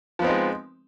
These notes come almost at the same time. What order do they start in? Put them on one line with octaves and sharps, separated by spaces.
F3 B3 C4 D#4 G#3